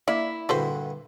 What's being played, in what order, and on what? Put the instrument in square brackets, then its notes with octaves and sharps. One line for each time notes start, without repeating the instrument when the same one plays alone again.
[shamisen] A#3 D5 [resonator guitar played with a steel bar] E4
[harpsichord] G2 A#2 D3 [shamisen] F#4 B4 C5